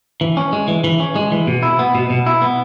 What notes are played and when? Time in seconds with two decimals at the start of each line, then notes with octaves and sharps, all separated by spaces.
0.21 E3
0.37 C#4
0.53 G#3
0.68 E3
0.84 E3
1.00 C#4
1.16 G#3
1.32 E3
1.47 B2
1.63 E4
1.79 B3
1.95 B2
2.10 B2
2.26 E4
2.42 B3